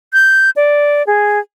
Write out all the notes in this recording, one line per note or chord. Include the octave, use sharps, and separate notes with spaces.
G6
D5
G#4